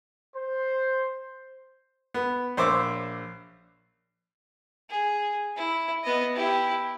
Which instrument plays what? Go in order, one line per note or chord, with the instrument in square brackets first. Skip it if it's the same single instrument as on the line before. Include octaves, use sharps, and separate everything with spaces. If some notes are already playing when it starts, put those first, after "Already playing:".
[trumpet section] C5
[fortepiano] B3
A#1 C5 C#5 E5 D6
[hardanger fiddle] G#4
E4
B3 D#5
E4 G4